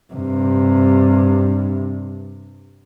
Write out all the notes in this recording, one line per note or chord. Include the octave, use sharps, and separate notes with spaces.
G2 C3